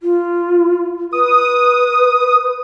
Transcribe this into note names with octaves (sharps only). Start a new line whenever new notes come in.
F4
B4 D#6